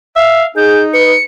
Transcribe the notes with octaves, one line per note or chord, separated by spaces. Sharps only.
E5 F5
D#4 G#4 G6
B4 C#7